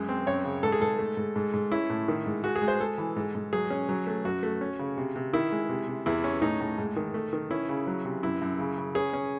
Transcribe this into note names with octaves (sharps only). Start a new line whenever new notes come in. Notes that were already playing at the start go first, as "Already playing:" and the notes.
Already playing: F#2 G#3
C4
F#2 C#5
C#3
G#2 A4
G#4
G#2 A4
A3
G#2
G#2
G#2
C#4 E4
A2
D#3
G#2
G#3 F#4
G#4
G#3
C5
G#3 A4
E3
G#2
G#2
F#3 G#4
C#4
F#3
A3
F#2 F#4
A3
C#4
C#3
C3
C3
D#3 E4
G#3
C3
C3
E2 E4
C#4
A2 D#4
A2
G#2
D#3
A3
D#3
C#4 E4
C#3
F#3
C3
F#2 E4
F#2
C#3
C#3
C#4 G#4
C#4